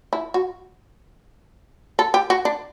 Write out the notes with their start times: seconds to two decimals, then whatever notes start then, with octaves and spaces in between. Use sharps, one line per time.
0.13 E4
0.34 F#4
1.99 A4
2.14 G4
2.30 F#4
2.45 D4